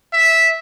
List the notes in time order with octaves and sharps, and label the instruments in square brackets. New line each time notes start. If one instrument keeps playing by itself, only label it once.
[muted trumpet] E5